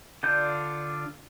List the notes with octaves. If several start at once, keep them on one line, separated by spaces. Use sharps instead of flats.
D3 D4 F4 G6